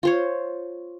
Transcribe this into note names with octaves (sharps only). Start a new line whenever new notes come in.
F4 C5 C#5